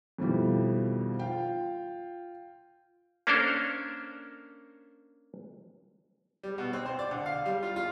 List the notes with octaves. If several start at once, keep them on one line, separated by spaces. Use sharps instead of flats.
F2 B2 D#3 F3 G3 E4
F4 F5 G5
A#3 C#4 D4 A4 A#4 C5
G3
B2
C4
C5
D5
D3
F5
G3
F4
F4